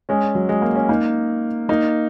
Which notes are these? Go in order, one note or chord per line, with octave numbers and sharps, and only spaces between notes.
G#3 C#4
F#3
G#3
A#3
C#4
A#3 D#4
A#3 D#4